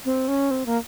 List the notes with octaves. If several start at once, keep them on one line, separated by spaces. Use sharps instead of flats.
C4
C#4
C4
A#3